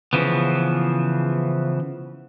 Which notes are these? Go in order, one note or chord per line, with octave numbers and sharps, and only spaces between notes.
C#3 E3 F3 B3